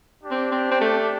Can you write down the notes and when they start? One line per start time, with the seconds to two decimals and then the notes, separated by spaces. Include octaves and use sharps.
0.22 D4 G4
0.31 C4
0.51 C4
0.71 C4
0.81 A3